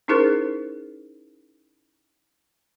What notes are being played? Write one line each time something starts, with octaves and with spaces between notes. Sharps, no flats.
C#4 D#4 E4 G#4 A#4 C5